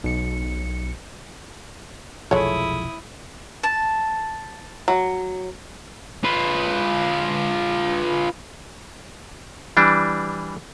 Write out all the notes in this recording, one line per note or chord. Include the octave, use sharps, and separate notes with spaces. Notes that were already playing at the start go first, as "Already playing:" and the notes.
B1 C#7
F1 B1 F3 G#3 A3 E4 C#5 D#6
A5
F#3
F4 B4
E3 G3 D4